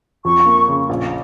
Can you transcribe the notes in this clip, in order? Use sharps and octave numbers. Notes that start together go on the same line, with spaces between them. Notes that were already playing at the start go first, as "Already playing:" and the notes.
F2 C#6
A#3
C#3
A#1